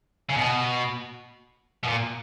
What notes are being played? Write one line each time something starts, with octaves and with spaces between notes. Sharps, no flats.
C#3
B2
B2
A#2